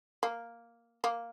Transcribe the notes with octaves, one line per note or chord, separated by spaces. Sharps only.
A#3
A#3